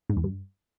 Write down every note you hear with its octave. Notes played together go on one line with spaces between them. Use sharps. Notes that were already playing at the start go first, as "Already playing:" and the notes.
G#2
E2
G2